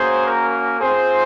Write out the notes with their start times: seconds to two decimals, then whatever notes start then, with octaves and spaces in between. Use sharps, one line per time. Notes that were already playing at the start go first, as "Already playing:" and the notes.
Already playing: A#3 C#4 F#4 G#4 C5
0.27 A#4
0.80 C4 F4 G#4 C5